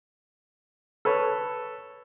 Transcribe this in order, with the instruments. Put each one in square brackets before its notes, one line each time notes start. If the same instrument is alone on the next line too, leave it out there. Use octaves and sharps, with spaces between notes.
[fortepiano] A4 B4 C#5